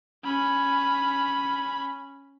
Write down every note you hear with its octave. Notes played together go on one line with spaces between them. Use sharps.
C#4 B5